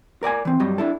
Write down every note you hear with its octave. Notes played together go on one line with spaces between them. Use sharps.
A#4 D5 F#5 G#5
E3 C4
G2 F#3 G3 D#5
D4 E4 A4